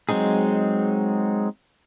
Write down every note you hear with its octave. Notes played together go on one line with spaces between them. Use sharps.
F#3 G#3 C4 D#4 G#4